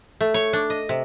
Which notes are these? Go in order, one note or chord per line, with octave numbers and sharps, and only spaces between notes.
A3
C#5
D4
D#5
C3